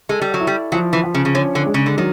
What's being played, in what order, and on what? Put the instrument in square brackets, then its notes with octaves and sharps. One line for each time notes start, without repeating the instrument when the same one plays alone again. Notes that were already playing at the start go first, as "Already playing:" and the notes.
[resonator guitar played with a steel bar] G#3 [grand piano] A4
[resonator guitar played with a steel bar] G3
F#3
[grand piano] E4
[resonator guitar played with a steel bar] G3
[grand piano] F3 [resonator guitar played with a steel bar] F#3
[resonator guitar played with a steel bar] E3
[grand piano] F3
[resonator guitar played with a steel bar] C#3
C#3
[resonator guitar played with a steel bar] D3 [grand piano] C#4
[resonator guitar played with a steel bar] D3
[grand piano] G#3
[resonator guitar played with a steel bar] C#3
D3
[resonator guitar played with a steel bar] D#3 [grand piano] F#3